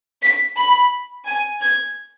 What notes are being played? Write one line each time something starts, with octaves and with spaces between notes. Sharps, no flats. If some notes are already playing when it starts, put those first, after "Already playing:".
B6
B5
G#5
G#6